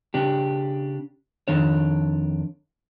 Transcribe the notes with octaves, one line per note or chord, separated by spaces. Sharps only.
C#3 D4 G4
F2 D#3 D4 C#5